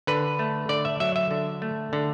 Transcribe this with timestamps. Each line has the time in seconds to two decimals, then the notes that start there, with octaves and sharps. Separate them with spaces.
0.07 D3 B4
0.39 A3
0.69 D3 D5
0.85 E5
1.00 F#3 E5
1.16 E5
1.31 D3
1.62 A3
1.93 D3